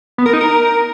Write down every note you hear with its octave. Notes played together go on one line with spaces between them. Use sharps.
B3
A#4
D#4
A#4